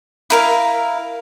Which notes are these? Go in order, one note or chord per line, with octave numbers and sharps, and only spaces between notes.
E4 A#4 F5